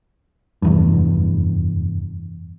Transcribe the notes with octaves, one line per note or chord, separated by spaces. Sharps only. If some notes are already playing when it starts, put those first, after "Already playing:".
F1 E2 G2